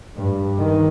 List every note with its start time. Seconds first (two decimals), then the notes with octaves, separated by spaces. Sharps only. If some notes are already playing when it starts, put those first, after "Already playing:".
0.16 G2
0.59 D#3